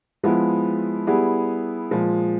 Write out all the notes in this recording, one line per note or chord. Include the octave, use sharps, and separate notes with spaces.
F3 G#3 B3 E4
G3 B3 E4 G#4
A#2 F3 G#3